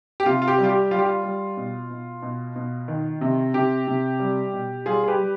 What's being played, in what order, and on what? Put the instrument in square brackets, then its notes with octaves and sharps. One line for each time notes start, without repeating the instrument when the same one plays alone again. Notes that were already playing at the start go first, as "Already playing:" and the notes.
[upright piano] G4
C3 F4
F4
G4
G3
F4
G4
G3 F4
G4
F4
G3
B2
B2
B2
B2
D#3
C3
C3 G4
C3
G3
B2
G3 F4 G#4
G#4
G4 B4
G3